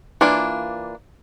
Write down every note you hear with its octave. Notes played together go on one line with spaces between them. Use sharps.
E3 A#3 D4 F4